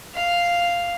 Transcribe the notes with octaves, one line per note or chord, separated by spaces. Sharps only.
F5